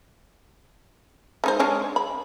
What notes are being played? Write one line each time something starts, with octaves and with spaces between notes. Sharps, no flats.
G#3 D#4 C5
G#3 C#4 D4
B5